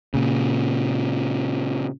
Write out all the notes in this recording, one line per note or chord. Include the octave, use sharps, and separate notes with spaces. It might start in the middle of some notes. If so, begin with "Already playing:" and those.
A#2 C#3